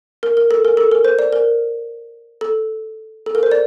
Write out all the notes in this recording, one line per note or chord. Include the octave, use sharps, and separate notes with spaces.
A#4
A#4
A4
A#4
A4
A#4
C5
D5
A#4
A4
A4
A#4
C5
D5